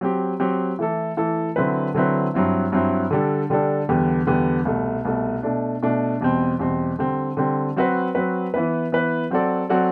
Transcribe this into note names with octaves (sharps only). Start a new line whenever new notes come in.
F#3 C4 G4
F#3 C4 G4
E3 A3 E4 A4
E3 A3 E4 A4
D3 F#3 C4 E4 B4
D3 F#3 C4 E4 B4
G2 F#3 C4 E4
G2 F#3 C4 E4
D3 G3 D4 A4
D3 G3 D4 A4
E2 D3 G3 B3
E2 D3 G3 B3
C2 B2 A3
C2 B2 A3
B2 A3 D4
B2 A3 D4
E2 B2 G3 C4
E2 B2 G3 C4
D3 G3 C4
D3 G3 C4
F#3 C4 F#4 B4
F#3 C4 F#4 B4
E3 B3 E4 B4
E3 B3 E4 B4
F#3 C4 F#4 A4 D5
F#3 C4 F#4 A4 D5